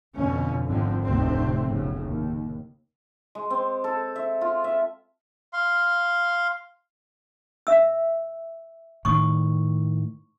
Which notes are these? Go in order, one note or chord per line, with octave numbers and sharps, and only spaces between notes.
F2 B2 D3 C#4
G#1 F2 D3 F3 C4
F1 D2 A2 C3 A3 C4
F1 B1 A2 C#3
D#2
G#3
C4
A4
E5
F4
E5
F5 C6
E5 E6
A2 D#3 C#6 D#6